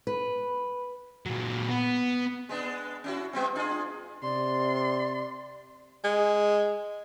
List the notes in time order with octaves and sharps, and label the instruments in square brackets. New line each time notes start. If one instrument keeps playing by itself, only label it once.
[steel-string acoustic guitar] B4
[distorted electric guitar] A#2 F#3
B3
[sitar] G#3 B3 D4
C#4 E4 F#4
G3 B3 C4
D4 F4 G#4
[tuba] C3 [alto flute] D5 [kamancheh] C6
[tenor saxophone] G#3